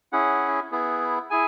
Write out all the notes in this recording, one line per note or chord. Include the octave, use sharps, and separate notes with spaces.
C#4 E4 G#4 F#5
B3 E4 G#4
E4 G#4 G#5